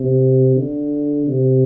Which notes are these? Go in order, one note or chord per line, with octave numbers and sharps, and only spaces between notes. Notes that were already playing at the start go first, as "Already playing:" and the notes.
Already playing: C3
D3
C3